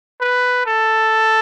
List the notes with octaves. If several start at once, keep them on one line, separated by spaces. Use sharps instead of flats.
B4
A4